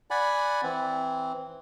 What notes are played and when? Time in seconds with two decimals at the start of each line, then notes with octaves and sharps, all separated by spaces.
0.11 D5 F#5 G#5 B5
0.63 E3 C4